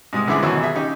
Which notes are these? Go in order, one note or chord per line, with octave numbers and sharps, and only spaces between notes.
G#2 C3 G#3 D#6
C#2 D3 E3 G#4 E5 D6
D#2 B2 E3 F#3
G#4 E5
C#3 D#4 G4